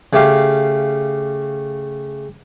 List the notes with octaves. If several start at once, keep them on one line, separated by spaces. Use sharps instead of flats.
C#3 A3 G4 F5